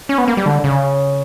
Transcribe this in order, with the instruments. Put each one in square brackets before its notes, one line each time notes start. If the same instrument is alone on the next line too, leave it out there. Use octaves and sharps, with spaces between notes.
[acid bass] C#4
B3
A#3
G3
D3
C#3